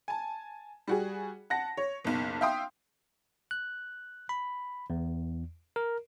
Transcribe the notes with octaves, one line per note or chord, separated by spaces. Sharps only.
G#5 A5
G3 F#4 G#4
F#5 A5 A#6
C#5
F#1 B1
E5 F5 G5 C6 D#6
F#6
B5
E2
A#4